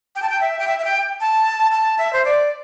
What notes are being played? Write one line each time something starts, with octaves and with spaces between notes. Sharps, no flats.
G5
A5
G5
E5
G5
E5
E5
G5
A5
A5
E5
C5
D5